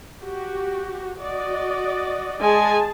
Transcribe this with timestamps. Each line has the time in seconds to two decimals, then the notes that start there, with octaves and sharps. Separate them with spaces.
0.22 F#4 G4
1.19 F#4 D5 D#5
2.40 G#3 G#4 G#5 A5